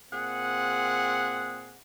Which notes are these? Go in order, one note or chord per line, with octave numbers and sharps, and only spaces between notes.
A#2 C4 G#4 F#5